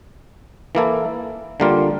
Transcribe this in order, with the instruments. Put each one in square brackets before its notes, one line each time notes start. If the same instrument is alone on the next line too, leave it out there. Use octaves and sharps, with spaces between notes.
[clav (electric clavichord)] E3 A#3 E4 A4
D3 G3 A#3 F4